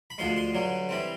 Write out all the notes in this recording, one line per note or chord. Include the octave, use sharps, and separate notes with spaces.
B5
D2 D3 F3 G#3 C6
C6
G2 D3 F#3
E3 G3 C4